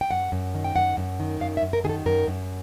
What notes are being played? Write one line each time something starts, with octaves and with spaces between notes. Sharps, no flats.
G5
F#2 F#5
F#2
D#3
G5
F#2 F#5
F#2
D#3
F#2 F5
E5
F#2
A#4
D#3 G#4
A4
F#2 A#4
F#2